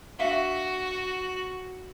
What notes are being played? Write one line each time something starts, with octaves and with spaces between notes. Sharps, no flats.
D4 F#4 E5 F5